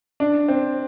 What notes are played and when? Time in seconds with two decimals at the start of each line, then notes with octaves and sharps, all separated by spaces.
0.20 D4
0.48 C4